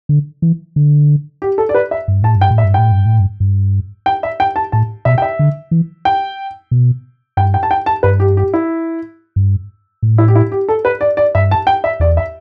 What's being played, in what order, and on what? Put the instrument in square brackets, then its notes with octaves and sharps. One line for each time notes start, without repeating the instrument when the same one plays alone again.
[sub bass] D3
E3
D3
[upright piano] G4
A4
D5
B4
E5
[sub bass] G2
[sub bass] A2 [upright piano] A5
[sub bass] G2
[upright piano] G5
[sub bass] A2
[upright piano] E5
[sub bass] G2
[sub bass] A2 [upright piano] G5
[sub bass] G2
A2
G2
G2
[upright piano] G5
E5
G5
A5
[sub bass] A2 [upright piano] A5
[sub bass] B2 [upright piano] E5
[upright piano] G5
E5
[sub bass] D3
E3
[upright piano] G5
[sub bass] B2
[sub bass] G2 [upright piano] G5
[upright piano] G5
A5
G5
A5
[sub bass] G2 [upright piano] B4
[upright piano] G4
G4
E4
[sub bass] G2
A2
[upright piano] E4
G4
E4
G4
A4
B4
D5
D5
[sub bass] G2 [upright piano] E5
[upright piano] A5
G5
E5
[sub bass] E2 [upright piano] D5
[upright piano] E5